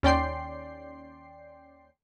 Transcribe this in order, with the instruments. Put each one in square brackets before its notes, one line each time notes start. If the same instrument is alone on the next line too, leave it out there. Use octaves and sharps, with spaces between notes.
[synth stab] D#2 C#4 D5 G5 C6 C7